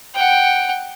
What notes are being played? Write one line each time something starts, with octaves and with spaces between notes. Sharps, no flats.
F#5 G5